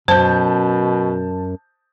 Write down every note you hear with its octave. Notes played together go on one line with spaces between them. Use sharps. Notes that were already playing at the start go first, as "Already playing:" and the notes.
F#2 B2 C5 A5 G6